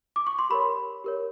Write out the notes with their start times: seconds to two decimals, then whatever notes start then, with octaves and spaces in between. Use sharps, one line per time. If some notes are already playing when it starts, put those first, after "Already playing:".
0.16 D6
0.27 C#6
0.39 C6
0.49 G4 A#4 C#5 B5
1.04 G4 A#4 C#5